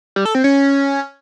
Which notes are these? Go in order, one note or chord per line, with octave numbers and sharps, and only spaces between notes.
G3
A4
C4
C#4